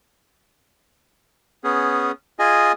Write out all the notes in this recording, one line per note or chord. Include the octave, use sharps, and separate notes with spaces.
B3 C#4 G#4
F4 G#4 D#5 G#5